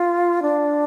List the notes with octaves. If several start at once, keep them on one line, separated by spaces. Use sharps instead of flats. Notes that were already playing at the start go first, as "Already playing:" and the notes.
Already playing: F4
D4